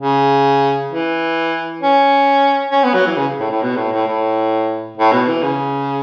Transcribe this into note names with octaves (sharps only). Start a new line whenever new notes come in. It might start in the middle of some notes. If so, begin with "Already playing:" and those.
C#3
E3
C#4
C#4
B3
F#3
E3
C#3
A2
A2
B2
A2
A2
A2
A2
B2
E3
C#3